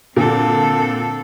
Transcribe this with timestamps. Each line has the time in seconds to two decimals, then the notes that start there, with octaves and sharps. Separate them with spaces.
0.17 A#2 D3 C4 A4